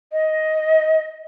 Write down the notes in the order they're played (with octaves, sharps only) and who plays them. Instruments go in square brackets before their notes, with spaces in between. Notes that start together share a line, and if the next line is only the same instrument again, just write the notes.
[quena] D#5